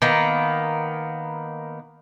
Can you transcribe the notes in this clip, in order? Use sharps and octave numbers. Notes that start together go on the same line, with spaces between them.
D#3 A#3 B3